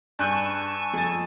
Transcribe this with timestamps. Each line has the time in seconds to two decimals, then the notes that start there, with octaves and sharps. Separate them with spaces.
0.19 G2 G#5 A5 C#6 E6 F#6 G6
0.94 F2 A6